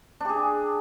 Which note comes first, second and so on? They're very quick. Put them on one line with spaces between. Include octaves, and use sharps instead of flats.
D4 G4 G#4